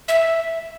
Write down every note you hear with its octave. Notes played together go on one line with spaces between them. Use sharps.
E5